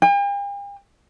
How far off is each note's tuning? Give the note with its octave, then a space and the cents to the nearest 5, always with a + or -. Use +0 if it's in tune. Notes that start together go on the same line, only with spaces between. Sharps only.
G5 +45